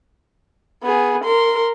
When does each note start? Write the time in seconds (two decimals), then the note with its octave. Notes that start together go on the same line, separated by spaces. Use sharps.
0.83 B3 G#4
1.24 A#4 C6